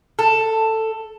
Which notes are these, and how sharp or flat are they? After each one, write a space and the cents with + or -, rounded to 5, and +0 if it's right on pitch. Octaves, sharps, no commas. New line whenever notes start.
A4 +10